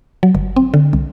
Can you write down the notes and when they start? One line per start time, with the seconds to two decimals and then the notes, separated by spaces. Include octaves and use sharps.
0.23 F#3
0.35 G1
0.56 C4
0.74 D3
0.93 C2